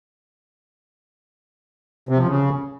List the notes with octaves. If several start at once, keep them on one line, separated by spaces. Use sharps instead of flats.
C3
F3
C#3